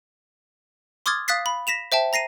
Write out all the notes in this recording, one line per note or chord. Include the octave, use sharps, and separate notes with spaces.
C6 D6 D#6 F6 G#6 A6
F5 D#6 F#6 A6 B6 C7
B5
A#6 B6 E7 F7
C5 E5 G5 A5
A#5 A#6 C7 D#7